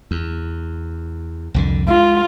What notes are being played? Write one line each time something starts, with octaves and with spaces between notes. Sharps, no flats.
E2
C2 F2 D3
G#3 F4